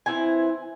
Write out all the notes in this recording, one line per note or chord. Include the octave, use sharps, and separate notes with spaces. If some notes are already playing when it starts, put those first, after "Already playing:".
E3 C4 E4 G#5